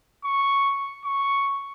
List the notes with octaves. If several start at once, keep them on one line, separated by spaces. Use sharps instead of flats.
C#6
C#6